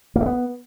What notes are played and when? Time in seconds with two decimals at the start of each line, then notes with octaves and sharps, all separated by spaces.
0.16 A#3
0.21 A3
0.26 B3